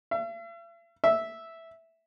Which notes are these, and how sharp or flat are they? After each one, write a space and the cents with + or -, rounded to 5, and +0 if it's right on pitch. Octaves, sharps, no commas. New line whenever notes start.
E5 +45
E5 -5